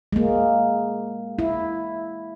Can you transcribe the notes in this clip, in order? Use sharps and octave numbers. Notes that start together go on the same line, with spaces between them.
G#3 A#3
E4